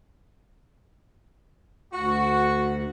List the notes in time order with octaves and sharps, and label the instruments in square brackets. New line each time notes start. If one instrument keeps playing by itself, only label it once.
[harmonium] D2 [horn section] F#4